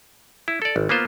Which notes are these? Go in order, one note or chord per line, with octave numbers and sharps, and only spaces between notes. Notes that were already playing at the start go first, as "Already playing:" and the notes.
E4
A4 D5
G#1
A#3 B3 F4 C5